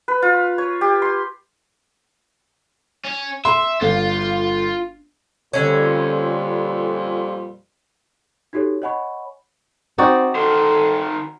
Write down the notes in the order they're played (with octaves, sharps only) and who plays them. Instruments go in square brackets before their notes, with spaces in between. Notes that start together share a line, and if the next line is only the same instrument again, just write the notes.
[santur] B4
F4
C#5
G4
C6
[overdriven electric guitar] C#4
[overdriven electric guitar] E5 [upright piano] C6
[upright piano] G1 [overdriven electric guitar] F4
[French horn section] F2 A#2 G3 [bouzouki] D3 C#4
[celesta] D#4 F#4 G4 A4 C#5
C#5 D#5 F#5 G#5 B5 C#6
[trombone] C4 [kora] D#4 F#4 D5
[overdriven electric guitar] D#3 C5 [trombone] A4